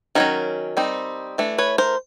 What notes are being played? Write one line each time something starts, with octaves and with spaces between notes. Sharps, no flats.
D#3 F#3 C#4 A#4
G3 C4 D#4
E3 A3 D4
B4 C#5
A#4 C5